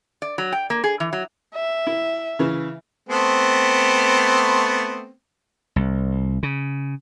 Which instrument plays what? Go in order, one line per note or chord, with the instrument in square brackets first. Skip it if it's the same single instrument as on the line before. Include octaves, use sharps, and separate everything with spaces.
[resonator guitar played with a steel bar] D5
F#3
G5
A#3
G#4
E3
F#3
[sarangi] E5
[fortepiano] E4
C#3 E3
[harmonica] A3 B3 C4
[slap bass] C2
C#3